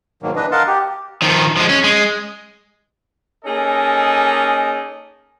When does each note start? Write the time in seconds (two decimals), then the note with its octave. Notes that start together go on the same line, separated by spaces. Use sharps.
0.23 G#2 B2 D#3 F#3 A#3
0.36 E3 D4 B4 D#5
0.52 A#4 D#5 F5 F#5 A5 C6
0.68 G4
1.22 D#3 F3
1.57 F3 G#3
1.69 C#4
1.84 G#3
3.45 A#3 C#4 D#4 G#4 A4 D#5